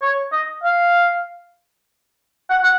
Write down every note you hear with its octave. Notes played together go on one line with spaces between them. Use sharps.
C#5
D#5
F5
F#5
F#5